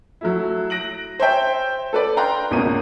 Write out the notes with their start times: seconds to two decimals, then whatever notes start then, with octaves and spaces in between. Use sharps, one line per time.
0.21 F#3 A3 E4
0.70 F#6 A#6 D7 F#7
1.20 C5 C#5 E5 G5
1.93 A4 B4 D5
2.17 F5 G5 A#5 C6 F#6
2.51 G#1 C#2 B2 A#3 C#4 D#7